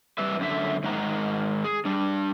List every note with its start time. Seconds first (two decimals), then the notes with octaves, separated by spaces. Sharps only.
0.18 G3 B4 E5
0.39 F#2 D3 E5
0.83 G#2 D#3 G#3 F#5 A#5
1.64 G#4
1.85 G3 D4